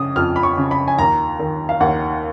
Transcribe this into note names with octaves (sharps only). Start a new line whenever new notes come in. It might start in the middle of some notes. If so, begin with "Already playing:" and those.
Already playing: C#3 D#6
F2 F6
B5
C#6
C#3
B5
G#5
D#2 A#5
D#3
F5
D#2 F#5